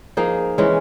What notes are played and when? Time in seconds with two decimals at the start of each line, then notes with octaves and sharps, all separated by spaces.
0.17 F3 A#3 D#4 G#4
0.58 E3 G#3 C#4